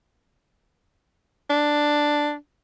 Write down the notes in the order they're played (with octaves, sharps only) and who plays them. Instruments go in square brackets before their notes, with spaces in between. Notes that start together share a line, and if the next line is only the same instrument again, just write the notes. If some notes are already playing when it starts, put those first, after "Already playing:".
[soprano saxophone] D4